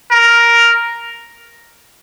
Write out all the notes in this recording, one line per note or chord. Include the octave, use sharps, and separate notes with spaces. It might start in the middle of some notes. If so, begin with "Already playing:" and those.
A#4